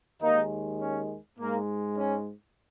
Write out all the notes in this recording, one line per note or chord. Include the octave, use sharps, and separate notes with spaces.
D#2 D#3 G#3 A#3 D#4
C#4
G#2 G#3 A#3
C#4